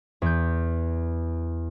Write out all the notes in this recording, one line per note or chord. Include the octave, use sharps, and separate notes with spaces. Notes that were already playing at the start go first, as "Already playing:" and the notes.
E2 G6